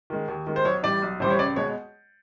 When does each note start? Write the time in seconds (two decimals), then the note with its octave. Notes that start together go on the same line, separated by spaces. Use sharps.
0.10 D#3 G#3
0.28 D#2
0.47 D#3 G#3
0.56 C5
0.64 B1 C#5
0.83 A2 E3 G3 D5
1.02 B1
1.20 A2 E3 G3 C5
1.30 C#5
1.39 C#2 D5
1.56 B2 G#3 C#5